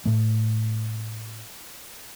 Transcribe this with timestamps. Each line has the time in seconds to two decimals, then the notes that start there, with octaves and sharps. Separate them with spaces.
0.05 A2 A3